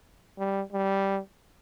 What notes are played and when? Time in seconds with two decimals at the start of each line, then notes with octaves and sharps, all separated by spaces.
0.38 G3
0.72 G3